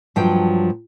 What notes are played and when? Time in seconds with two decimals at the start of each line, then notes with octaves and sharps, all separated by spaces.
0.16 G2 F3 F#3 G5